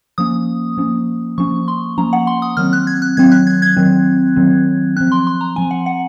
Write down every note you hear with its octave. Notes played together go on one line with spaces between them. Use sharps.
F3 A#3 C#4 D#6
F3 A#3 C#4
F3 A#3 C#4 C#6
C6
F3 A#3 C#4 A#5
F#5
C6
D#6
D#3 F#3 C4 F6
F#6
G#6
F#6
D#3 F#3 C4 G#6
F#6
G#6
G#6
D#3 F#3 C4
D#3 F#3 C4
F3 C4 F#6
C6
C6
A#5
F3 C4 G#5
F#5
F#5